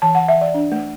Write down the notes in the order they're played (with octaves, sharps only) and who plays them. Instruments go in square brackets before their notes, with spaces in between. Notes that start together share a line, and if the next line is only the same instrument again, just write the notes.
[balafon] E3 A5
E3 F#5
E5
E3
D5
D4
A3